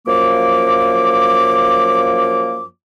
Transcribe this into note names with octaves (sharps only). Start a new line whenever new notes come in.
F#2 F3 A#3 D6